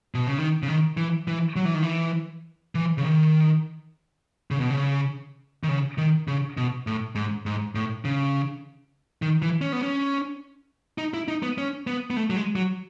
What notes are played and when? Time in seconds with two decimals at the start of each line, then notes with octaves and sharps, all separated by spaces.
0.14 B2
0.27 C#3
0.38 D#3
0.63 C#3
0.68 D#3
0.97 E3
1.28 E3
1.56 F#3
1.65 E3
1.74 D#3
1.83 E3
2.75 E3
2.98 C#3
3.04 D#3
4.51 C#3
4.60 B2
4.70 C#3
5.64 D#3
5.69 C#3
5.98 D#3
6.28 C#3
6.57 B2
6.87 A2
7.15 G#2
7.46 G#2
7.75 A2
8.05 C#3
9.22 D#3
9.42 E3
9.61 C#4
9.72 B3
9.83 C#4
10.98 D#4
11.14 E4
11.28 D#4
11.43 B3
11.58 C#4
11.87 B3
12.10 B3
12.17 A3
12.30 F#3
12.36 G#3
12.56 F#3